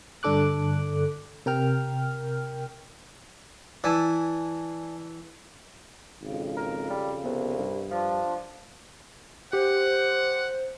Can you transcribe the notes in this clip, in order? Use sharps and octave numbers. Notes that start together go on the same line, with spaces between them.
G2 D3 D4 A4 D6 F#6
C3 A#4 G5 F6
E3 D5 G#5 A5
G#1 F2 C#3
A#4
G3
C2 B3
G2
F3 D4 F4
G4 C5 F#5